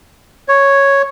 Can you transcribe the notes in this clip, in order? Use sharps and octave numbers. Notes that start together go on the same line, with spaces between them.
C#5